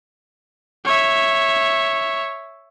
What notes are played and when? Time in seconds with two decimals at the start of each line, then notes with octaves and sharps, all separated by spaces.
0.85 C#5 E5